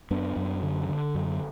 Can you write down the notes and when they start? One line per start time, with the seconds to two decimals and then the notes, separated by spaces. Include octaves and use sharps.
0.11 F#2 B3 D4
0.36 F#2
0.63 D3
0.89 D3
1.15 F#2